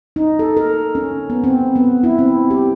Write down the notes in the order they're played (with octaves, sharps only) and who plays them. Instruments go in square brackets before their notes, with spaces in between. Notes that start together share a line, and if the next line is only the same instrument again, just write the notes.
[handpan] D#4
A4
A#4
C#4
B3
C4
B3
E4
C4
G4